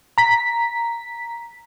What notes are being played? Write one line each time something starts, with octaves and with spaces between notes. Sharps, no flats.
A#5 B6